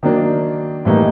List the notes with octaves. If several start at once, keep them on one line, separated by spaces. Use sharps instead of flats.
D#3 F#3 A#3 D4
A2 E3 G3 A#3 D#4